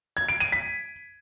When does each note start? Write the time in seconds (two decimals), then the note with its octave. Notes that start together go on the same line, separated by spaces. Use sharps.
0.17 G#6
0.29 D7
0.40 D#7
0.52 B6